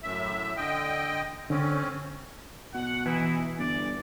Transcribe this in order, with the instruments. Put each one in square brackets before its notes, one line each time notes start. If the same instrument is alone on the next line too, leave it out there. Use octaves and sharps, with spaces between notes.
[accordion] F#2 A2 E5
D3 D#5 G5
[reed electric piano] D3 [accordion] C4 C#4
[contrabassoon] B2 [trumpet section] F#5
[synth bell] E3 [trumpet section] D#4 E4
[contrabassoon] G1 [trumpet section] D5